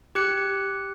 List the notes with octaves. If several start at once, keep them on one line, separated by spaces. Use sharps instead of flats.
G4 F#6 C#7